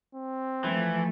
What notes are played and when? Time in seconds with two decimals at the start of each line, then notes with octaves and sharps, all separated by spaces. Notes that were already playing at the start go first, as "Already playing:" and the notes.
0.15 C4
0.64 E3 F3 A3